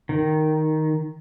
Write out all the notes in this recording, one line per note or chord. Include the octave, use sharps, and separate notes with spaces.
D#3